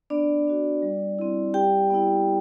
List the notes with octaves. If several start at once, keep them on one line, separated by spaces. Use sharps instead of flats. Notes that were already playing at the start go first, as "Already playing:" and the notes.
B3 D4 D5
D4 F#4
G3
C4 E4
G3 G4 G5
B3 E4